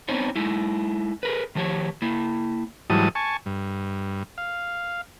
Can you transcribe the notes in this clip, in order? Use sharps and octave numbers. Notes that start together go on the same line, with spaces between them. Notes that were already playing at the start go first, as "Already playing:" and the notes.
B3 C4 D4 D#4 C5 C#5
G#3 D#4 E4
G#4 A#4 B4
D#3 F3 G4 C#5
A#3 E4
G#2 E3 F#3 G3 A5 D#6
G#5 A5 C#6
G2
F5